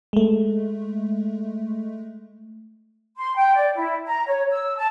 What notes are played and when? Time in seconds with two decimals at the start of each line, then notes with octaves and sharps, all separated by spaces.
0.13 G#3 A3
3.17 C6
3.35 G5
3.55 D5
3.75 E4
4.06 A#5
4.26 C#5
4.50 E6
4.77 A5